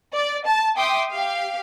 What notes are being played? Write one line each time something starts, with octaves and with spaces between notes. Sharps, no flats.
D5
A5
E5 G5 C6 D6 D#6
G4 F5